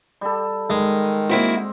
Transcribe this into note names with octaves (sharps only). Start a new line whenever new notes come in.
G3 A4
D#3 G#3
A#3 C4 E4 F#4